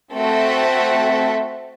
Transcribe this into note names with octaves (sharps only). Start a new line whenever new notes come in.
A3 C4 F#4 A4 E5